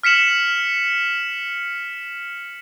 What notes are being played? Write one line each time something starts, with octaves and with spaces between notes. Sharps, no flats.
F6 B6 C#7 E7 F#7